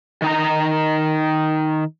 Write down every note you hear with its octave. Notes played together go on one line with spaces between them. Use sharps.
D#3 D#4 A#5